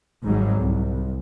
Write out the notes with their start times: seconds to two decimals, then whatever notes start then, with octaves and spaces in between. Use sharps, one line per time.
0.24 G#1 G#2 F#3 G3
0.59 C2